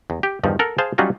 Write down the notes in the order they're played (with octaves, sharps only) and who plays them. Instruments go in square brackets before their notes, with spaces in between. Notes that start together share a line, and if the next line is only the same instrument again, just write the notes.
[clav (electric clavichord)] E2
G4
E2 G2 D#3 F3
A4 A#4 F#5
G#4 C5 F5 A5
F#3 G3 C#4 D#4 F4 F#4